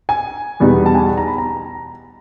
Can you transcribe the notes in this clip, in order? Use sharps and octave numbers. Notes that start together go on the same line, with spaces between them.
G#5
E2 B2 G3 B3 D#4
A5
G#5
A5
A#5
B5
A#5